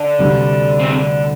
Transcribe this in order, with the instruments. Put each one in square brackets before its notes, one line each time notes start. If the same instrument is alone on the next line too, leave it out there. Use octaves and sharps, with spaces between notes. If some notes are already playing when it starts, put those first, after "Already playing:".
Already playing: [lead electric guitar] D3
[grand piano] D2 C3 G3
[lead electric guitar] C4